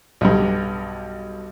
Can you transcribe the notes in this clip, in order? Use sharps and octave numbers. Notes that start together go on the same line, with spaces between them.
B1 G2